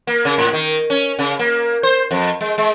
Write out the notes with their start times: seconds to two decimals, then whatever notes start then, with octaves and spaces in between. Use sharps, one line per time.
0.07 A#3
0.25 C#3
0.38 A2
0.53 D#3
0.90 C#4
1.19 C#3
1.39 A#3
1.83 C5
2.11 F2
2.41 G#3
2.58 G#3